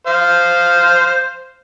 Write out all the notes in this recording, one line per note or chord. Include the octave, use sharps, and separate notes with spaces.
C5 F5